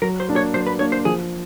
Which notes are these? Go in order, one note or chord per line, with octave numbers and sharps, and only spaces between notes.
F#3 A#4
C5
A#3 D4
C#5
F#3 C5
B4
A#3 D4 C#5
C5
F3 G#4